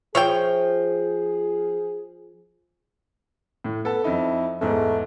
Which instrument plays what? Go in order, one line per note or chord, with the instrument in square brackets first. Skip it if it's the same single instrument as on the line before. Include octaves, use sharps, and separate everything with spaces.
[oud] F3 [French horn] G#4 [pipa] C#5 E5 G5
[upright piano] A2
[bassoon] B3 [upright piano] A4 A5
[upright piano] F2 D#4 [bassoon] E4
[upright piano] E2 G#2 [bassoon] A3